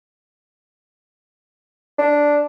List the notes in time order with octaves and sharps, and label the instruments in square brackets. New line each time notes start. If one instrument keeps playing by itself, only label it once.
[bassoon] D4